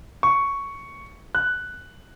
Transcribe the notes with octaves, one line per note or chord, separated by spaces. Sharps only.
C#6
F#6